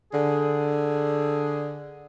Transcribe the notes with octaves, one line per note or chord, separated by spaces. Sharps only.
D3 G#4